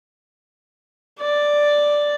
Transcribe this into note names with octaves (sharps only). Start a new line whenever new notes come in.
D5